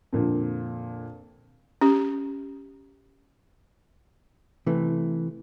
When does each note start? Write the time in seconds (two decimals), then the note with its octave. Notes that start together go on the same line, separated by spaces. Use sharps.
0.12 F2 A#2 D3
1.81 C#4 G4
4.66 C3 E3 A3